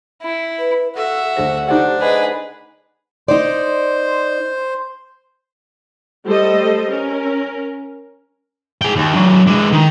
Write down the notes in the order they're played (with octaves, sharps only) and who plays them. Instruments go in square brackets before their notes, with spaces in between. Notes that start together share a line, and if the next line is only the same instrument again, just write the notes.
[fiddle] E4
[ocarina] B4
[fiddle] F#4 [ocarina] A4 [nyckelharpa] E5
[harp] D2 A4 A#6 [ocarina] C5
[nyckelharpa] D4 [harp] D#4 C5 F#5 [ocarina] G4
[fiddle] G#4 B4 [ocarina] D#5
[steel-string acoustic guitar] D#4 D5 [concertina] C5
[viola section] G3 A3 G4 A4 C5 D#5
C#4 A#4
[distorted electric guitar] G#4 G5
D#2
F#3 D4
G#3 D4
D#3